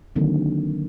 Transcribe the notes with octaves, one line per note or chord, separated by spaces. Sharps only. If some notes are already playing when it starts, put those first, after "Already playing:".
D3 D#3 F#3 A#3 C4